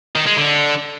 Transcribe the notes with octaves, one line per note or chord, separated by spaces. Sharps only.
D#3
G#3
D3